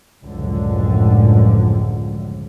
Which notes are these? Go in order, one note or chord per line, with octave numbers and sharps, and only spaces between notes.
C#2 F#2 A2 D3 F3